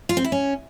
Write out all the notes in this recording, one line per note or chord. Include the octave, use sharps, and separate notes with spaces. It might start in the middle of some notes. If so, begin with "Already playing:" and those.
F4
C4
E4
C#4